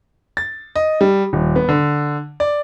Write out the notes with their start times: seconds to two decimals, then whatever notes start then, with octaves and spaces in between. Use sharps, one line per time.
0.37 A6
0.76 D#5
1.01 G3
1.33 D#1
1.56 B3
1.69 D3
2.40 D5